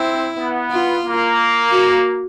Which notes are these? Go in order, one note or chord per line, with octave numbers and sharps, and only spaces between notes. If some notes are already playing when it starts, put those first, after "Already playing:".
Already playing: C4 E4
B3
F4
A#3
F#4